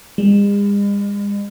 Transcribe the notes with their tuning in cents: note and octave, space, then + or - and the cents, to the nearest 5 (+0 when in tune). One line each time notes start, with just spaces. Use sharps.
G#3 -45